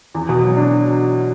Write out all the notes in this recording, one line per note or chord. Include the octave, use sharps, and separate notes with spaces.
E2
B2
F#3
D4